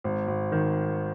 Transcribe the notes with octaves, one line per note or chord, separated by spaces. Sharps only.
G#1
G#1
D#3